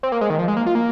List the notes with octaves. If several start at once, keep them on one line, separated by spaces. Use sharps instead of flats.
C4
A#3
G#3
D#3
F3
G#3
A#3
F4
A#3